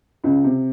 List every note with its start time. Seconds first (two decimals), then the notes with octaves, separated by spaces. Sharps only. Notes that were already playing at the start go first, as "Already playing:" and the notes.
0.24 C#2 C#3
0.44 C3